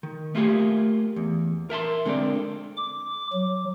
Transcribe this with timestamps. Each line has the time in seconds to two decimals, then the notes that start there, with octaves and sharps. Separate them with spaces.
0.03 D#3
0.35 A3 A#3 F4 G4 G#4
1.16 E2
1.70 A#4 E5 A5 C6
2.05 D3 G#3 C4 A#4 D5
2.77 D6
3.33 F#3